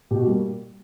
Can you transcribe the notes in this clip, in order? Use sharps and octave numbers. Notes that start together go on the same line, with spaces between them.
B2 G4
F#4
G3 A#3